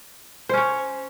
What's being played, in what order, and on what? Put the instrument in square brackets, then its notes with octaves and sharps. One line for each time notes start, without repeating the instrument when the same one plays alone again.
[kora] C5
C#4
C#5